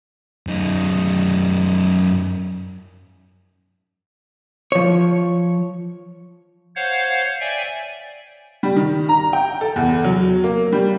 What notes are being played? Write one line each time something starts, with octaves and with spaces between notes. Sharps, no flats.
F#2 D#4
F3 C#5
C5 C#5 F5 F#5
D5 E5 G5 G#5
G3
D#3
A#5
G5
A4
E2
F#3
A#3
G3